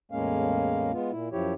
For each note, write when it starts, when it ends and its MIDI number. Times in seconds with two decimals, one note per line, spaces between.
0.12 0.92 40
0.12 0.92 45
0.12 0.92 56
0.12 0.92 58
0.12 0.92 61
0.12 0.92 77
0.93 1.11 56
0.93 1.11 59
0.93 1.11 65
1.11 1.29 46
1.11 1.29 64
1.32 1.54 42
1.32 1.54 53
1.32 1.54 64
1.32 1.54 67
1.32 1.54 73